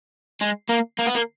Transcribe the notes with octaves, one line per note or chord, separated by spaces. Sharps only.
G#3
A#3
A#3
B3
A#3